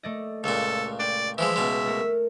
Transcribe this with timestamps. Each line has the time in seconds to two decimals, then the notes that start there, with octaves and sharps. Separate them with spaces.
0.03 A3 D5 D#5
0.44 C#2 A#2 A4
0.99 D5 G5
1.38 E3 F3 G#3 E5
1.56 C#2 B2 G#3
1.87 A3 A#4